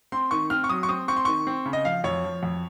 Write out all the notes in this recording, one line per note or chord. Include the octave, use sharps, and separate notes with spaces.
C4 C6
D#3 C#6
C4 F6
C#6
F#3 D#6
C#6
C4 D#6
C4 C#6
C6
D#3 C#6
C4
C#3
D#5
F3 F5
F2 C#5
F3
F2